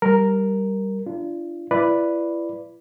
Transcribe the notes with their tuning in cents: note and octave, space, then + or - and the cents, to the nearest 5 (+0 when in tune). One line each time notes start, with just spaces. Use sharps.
G3 -10 A#4 +0
D4 +0 F4 -35
E4 +35 B4 +0 D5 +0